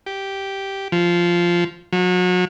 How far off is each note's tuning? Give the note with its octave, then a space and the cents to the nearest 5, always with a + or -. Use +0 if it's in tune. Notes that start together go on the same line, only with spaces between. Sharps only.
G4 -5
F3 -5
F#3 -35